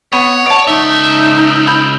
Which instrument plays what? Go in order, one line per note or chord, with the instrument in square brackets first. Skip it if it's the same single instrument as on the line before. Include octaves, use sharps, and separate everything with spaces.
[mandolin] B3 [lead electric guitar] C#5 [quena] F#5
[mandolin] D5 A5
[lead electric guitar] C#2 E5 [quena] D#4
[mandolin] B5 G6